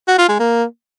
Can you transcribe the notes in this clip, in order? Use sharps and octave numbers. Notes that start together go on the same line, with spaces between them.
F#4
F4
G#3
A#3